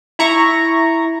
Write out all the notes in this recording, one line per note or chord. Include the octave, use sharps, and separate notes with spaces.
E4 A#5 C#6